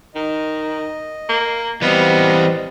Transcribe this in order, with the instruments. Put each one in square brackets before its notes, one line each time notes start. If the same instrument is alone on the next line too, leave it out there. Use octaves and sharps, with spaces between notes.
[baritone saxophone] D#3 [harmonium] D#5
[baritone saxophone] A#3
[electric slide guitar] E3 D5 F5 [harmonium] G3 C4 D#5 [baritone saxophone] B3